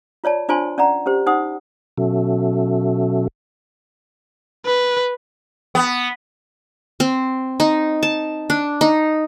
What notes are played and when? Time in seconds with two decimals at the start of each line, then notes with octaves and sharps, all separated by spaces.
0.24 F4 C#5 D5 A5
0.49 D4 F4 C5 G#5 A5 C6
0.78 C#4 D5 F#5 A#5
1.06 C#4 G4 C5
1.26 D#4 C5 F#5 D#6
1.98 B2 F#3 C#4 F#4 A4 E5
4.66 B4
5.75 B3
7.00 C4
7.60 D#4
8.03 A5
8.50 D4
8.81 D#4